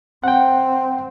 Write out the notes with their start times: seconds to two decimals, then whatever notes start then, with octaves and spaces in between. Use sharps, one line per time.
0.24 C4 F#5 G5